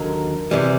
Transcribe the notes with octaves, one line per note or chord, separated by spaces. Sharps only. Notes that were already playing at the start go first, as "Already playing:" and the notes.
Already playing: D#2 D3 F#3 A#4
C3 E3 G3